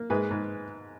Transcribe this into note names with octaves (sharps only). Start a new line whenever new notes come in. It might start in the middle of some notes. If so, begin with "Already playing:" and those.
Already playing: A#3
G#2 G#4 B4
G#2